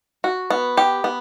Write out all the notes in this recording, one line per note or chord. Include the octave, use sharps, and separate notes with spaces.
F#4
B3
G4
B3